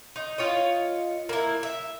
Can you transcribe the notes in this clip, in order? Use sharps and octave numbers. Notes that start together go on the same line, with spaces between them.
D#4
F4 C#5 D#5
A#3 E4
E5